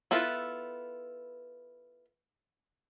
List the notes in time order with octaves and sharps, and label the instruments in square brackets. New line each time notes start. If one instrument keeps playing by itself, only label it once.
[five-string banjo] B3 E4 F4 A4 B4